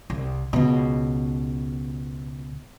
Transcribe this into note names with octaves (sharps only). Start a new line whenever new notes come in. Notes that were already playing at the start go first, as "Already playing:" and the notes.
C2
C#2 B2